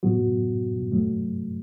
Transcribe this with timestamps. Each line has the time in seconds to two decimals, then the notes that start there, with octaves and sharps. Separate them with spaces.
0.03 A2 F#3 B3 F#4
0.92 G2 F#3 A3